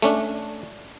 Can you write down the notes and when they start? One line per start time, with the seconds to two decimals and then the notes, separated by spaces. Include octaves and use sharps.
0.02 A3 C#4 D4